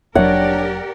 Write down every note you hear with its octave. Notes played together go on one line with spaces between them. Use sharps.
F1 F#3 D4 G4 A#4 C#5 D5 F#5